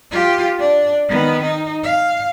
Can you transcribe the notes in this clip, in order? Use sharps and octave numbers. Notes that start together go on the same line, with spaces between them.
F4 G4
D4
D#3 B3
D#4
F5